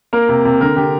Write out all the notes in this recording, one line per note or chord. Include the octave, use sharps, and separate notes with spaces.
A#3 A#4
C3
C3
D3 A#4
D3 G4